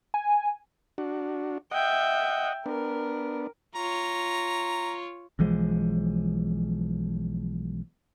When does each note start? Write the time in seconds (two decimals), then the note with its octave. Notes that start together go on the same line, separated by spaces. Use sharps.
0.14 G#5
0.98 D4 F#4
1.72 D#5 E5 F#5 G5
2.66 B3 D4 A#4
3.75 F4 C#5 A#5
5.39 B1 E3 F3 G#3